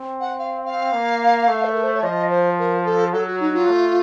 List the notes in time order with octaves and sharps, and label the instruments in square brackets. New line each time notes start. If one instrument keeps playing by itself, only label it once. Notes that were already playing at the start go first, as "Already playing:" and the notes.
Already playing: [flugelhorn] C4
[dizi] F#5
F5
F5
[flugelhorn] A#3
A3
[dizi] A4
A#4
C5
C#5
[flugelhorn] F3 [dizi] D#5
[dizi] C5
A#4
A4
[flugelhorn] F#3 [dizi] A4
[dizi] F#4
D#4
F4
[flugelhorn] A3